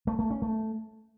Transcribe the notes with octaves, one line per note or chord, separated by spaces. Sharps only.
A3
A3
C#4
A3